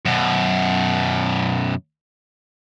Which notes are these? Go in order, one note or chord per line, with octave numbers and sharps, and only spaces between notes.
F#2 B2